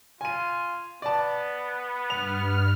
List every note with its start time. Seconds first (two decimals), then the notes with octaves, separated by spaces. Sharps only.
0.21 F4 G#5 D#7
1.02 B3 D5 A5
2.10 G2 F6 F7